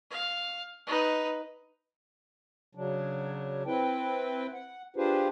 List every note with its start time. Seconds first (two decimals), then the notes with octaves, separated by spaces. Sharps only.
0.11 F5
0.87 D#4 B4
2.75 C#3 F#3 D4
3.67 C4 E4 B4 G5
4.54 F#5
4.96 D4 F4 G4 G#4 B4 C5